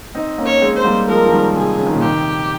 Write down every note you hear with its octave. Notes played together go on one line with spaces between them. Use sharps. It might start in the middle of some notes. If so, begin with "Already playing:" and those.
C4 D#4
A#3 C#4
C#5
G#3 C4
C5
G3 A#3
F3 G#3 A#4
F3
D#3 G3
C3 G#4
C#3
D#3
A#2 C#3
C3 D#3 G4